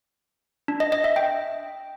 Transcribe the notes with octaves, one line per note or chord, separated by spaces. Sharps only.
D4
D#5
D#5
E5
G5